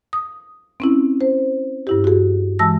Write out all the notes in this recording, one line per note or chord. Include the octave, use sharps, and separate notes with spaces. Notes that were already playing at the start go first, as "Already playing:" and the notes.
D#6
C4 C#4 E4
C5
G2 E4 G4
F#4 G#4
E3 G#3 A5 E6 A#6